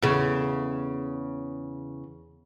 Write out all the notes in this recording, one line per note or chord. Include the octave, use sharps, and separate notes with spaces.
E2 C#3